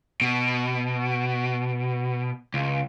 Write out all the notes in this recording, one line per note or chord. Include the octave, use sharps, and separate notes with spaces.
B2
C#2